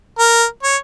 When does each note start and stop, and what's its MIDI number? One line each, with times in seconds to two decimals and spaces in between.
0.19 0.45 70
0.63 0.77 73